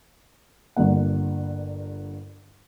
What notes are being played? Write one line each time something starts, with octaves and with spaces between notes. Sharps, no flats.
G1 G2 G3 A#3 F#5